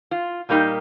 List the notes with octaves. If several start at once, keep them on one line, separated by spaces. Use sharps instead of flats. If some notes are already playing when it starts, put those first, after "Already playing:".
F4
A#2 G3 A#3 D#4 G4